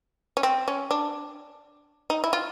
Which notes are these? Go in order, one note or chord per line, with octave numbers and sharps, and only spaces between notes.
C#4
C4
C#4
D4
D#4
E4
F4